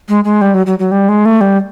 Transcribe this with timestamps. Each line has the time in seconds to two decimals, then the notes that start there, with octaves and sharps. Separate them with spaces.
0.09 G#3
0.24 G#3
0.41 G3
0.54 F#3
0.66 F#3
0.79 F#3
0.91 G3
1.09 G#3
1.25 A3
1.41 G3